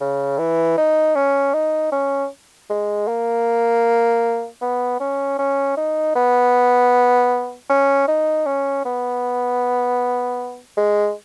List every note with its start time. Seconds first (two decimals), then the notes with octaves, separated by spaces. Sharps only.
0.01 C#3
0.39 E3
0.78 D#4
1.16 C#4
1.54 D#4
1.92 C#4
2.70 G#3
3.08 A#3
4.62 B3
5.00 C#4
5.39 C#4
5.77 D#4
6.16 B3
7.70 C#4
8.08 D#4
8.46 C#4
8.85 B3
10.77 G#3